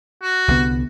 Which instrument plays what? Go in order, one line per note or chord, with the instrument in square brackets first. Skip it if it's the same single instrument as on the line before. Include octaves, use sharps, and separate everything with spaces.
[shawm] F#4
[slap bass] C2 D3 B3